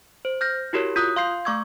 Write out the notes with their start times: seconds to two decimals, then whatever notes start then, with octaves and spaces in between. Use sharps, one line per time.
0.25 C5
0.41 F6 G6 A#6
0.73 E4 F#4 G4 A#4 C#5
0.96 F4 D#6 F#6
1.16 F5 C6 G6 C7
1.45 A3 F5 C#6 D6 E6 G#6